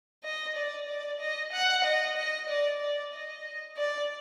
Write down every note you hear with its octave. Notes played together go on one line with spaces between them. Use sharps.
D#5
D5
D5
D#5
F#5
D#5
D#5
D5
D5
D#5
D5